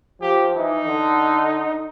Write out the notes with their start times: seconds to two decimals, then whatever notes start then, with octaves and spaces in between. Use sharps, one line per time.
0.21 F3 G4
0.56 E3 D#4
0.87 D3